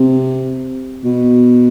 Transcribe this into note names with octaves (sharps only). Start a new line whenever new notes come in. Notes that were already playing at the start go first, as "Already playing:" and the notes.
Already playing: C3
B2